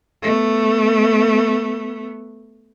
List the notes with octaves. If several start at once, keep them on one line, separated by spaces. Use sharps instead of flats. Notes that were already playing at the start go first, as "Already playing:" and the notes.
A3 B3